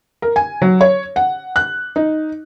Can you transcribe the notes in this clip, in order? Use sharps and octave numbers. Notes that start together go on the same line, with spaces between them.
A#4
G#5
F#3
C#5
F#5
F#6
D#4